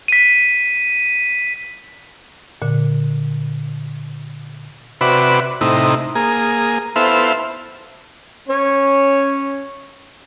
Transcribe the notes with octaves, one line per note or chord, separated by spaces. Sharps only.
B6 D#7
A#2 D3
C3 F#4 B4 D5 E5 B5
A2 C3 D#4 E4
A#3 G#4
B3 E4 A4 C5 E5 F5
C#4 C#5